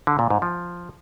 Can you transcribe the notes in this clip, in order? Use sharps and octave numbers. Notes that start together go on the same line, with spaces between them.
D3
A#2
G#2
F3